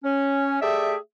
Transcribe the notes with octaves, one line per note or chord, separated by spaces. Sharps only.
C#4
A3 G4 G#4 D5 E5